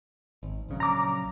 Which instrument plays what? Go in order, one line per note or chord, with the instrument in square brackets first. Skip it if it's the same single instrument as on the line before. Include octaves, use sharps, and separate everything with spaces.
[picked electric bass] G#1
A#1 C#3 F#3
[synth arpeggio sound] A#5 D6